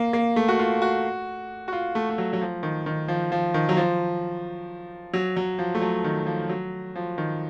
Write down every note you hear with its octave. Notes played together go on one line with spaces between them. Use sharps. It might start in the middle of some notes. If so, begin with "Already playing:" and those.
Already playing: A#3
A#3
A3
F#4
F4
F#4
F#4
F4
A3
A3
F#3
F#3
F3
D#3
D#3
F3
F3
D#3
F#3
F3
F#3
F#3
F3
A3
F#3
D#3
F3
F#3
F3
D#3